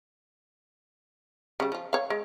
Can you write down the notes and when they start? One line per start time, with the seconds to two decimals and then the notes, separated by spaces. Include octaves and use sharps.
1.60 C#3 G3
1.72 F3 F4
1.93 C#5 F5
2.10 G#3